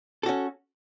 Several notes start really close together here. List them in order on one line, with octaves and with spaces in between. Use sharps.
A4 F#4 C#4